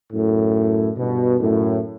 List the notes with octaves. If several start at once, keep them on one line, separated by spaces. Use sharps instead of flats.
F#2 A2
G2 B2
F#2 A2